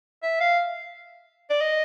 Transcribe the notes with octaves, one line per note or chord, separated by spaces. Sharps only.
E5
F5
D5
D#5